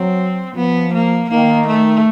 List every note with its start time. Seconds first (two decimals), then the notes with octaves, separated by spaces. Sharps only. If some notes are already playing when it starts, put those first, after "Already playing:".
Already playing: F#3 C4
0.55 F3 B3
0.93 A#3
1.30 D#3 A#3
1.67 A3